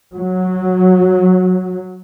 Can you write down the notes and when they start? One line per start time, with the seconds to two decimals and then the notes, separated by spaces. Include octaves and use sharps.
0.13 F#3